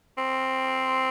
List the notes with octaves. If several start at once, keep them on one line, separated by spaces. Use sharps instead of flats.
C4